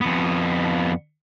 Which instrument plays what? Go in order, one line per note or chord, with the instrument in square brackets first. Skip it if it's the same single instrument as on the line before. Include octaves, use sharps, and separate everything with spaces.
[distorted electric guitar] F2 B3